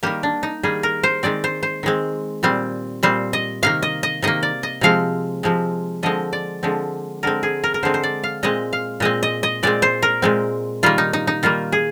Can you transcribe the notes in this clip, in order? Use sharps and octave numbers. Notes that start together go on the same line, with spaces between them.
D#3 G3 A#3 G4
D4
D#4
D#3 G3 A#3 G#4
A#4
C5
D#3 G#3 C4 D5
C5
C5
D#3 G#3 C4
A#2 G3 C4
A#2 G3 C4 C5
D#5
C3 D#3 A#3 F5
D#5
D#5
C3 D#3 A#3 D#5
D5
D#5
C3 F3 G#3 C4 F5
C3 F3 G#3 C4
D3 F3 G#3 C4 D#5
D5
D3 F3 G#3 C4
D3 G#3 C4 A#4
G#4
A#4
A#4
D3 G#3 C4 C5
C5
D5
F5
A#2 G#3 C4 D#5
F5
A#2 G#3 C4 D#5
D#5
D#5
A#2 G#3 C4 D5
C5
A#4
A#2 G#3 C4
D#3 G3 A#3 F4
D#4
D#4
D#4
D#3 G3 A#3 F4
G#4